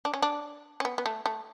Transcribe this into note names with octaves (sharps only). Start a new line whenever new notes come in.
D4
C#4
D4
C#4
B3
B3
A3
A3